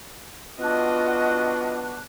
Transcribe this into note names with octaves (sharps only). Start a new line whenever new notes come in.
B3 D4 F4 F#4 D#5 F#6